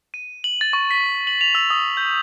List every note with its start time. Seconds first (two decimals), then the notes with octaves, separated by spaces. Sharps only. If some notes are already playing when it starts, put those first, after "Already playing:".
0.14 D#7
0.44 F#7
0.61 A6
0.73 C#6
0.91 B6
1.27 F#7
1.41 F7
1.55 E6
1.70 D#6
1.97 G6